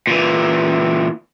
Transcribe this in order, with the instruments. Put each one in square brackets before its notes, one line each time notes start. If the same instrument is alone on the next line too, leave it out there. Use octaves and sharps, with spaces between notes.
[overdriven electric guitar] A#2 E3